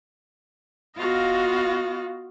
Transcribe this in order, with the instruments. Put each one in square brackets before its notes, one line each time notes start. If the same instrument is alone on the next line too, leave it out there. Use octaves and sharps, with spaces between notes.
[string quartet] B3 F4 F#4 D#5 F5